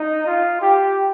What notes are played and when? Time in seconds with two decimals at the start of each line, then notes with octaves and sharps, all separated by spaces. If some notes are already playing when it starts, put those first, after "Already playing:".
Already playing: D#4
0.27 F4
0.62 G4